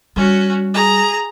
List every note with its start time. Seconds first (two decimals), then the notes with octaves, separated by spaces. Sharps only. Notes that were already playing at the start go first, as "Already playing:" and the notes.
0.16 G3 C#4 F#4
0.74 G#4 A#5